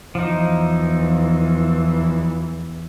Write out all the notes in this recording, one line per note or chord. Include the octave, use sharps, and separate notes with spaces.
E2 E3 F3 D#4